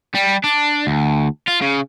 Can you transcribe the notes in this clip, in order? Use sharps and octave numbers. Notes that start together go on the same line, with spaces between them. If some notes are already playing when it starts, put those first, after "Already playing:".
G3
D4
D2
F4
C#3